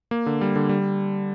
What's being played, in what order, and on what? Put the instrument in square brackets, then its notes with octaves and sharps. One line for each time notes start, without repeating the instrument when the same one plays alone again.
[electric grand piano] A#3
D3
G3
D3
G3